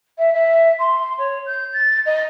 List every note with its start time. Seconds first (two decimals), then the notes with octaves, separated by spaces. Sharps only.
0.19 E5
0.34 E5
0.79 C6
1.18 C#5
1.46 G6
1.73 A6
2.06 D#5